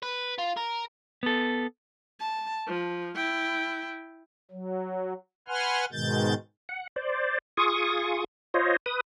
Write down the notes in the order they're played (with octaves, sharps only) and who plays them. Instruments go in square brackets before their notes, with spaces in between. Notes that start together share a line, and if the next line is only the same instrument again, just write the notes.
[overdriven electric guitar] B4
F4
A#4
[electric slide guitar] B3 A4
[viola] A5
F3
E4 G5
[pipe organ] F#3
B4 F#5 G#5 C6 F6
G#2 B2 D#3 G#3 G6 A6
[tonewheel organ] F#5
C5 D5
F4 G#4 C#6 D#6
F4 C5 C#5 D#5
B4 D#6